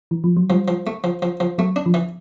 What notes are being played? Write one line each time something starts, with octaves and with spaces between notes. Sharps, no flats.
E3
F3
F#3
F3 G3
F3
A3
F3
F3
F3
F#3 A3
D4
F3
E3